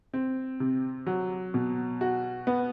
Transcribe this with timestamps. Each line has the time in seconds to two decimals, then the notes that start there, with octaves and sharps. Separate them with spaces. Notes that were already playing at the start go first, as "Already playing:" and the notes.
0.14 C4
0.60 C3
1.06 F#3
1.54 B2
2.01 F#4
2.47 B3